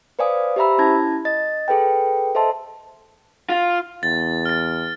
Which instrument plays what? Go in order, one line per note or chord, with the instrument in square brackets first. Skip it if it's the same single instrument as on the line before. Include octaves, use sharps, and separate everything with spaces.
[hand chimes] B4 C5 D5 F5 G#5 D#6
G4 C5 E5 A#5 B5 E6
C#4 E4 A5 G#6 A#6
D#5 A6
G#4 A4 B4 G5
A4 C5 D#5 E5 A5 C6
[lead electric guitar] F4
[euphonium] E2 [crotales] A6
[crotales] F6 A6